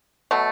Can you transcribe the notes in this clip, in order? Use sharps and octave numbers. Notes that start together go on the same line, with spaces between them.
B2 F#3 A3